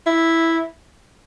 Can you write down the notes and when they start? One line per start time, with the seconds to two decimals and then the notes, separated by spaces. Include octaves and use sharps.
0.07 E4